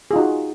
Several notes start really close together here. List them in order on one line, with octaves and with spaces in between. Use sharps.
G#4 F4 D#4 F#4